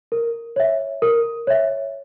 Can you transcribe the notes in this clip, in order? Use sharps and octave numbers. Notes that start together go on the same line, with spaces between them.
A#4
C#5 E5
A#4
C#5 E5